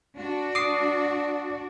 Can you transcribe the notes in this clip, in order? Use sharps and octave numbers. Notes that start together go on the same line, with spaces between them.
D4 F#4 D5
D6 D#6 C7